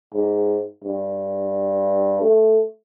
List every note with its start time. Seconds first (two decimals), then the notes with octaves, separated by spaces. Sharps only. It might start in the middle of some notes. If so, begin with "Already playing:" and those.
0.14 G#2
0.84 G2
2.21 A3